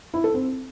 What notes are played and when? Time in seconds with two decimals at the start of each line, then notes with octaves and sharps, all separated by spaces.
0.14 E4
0.24 A4
0.34 C4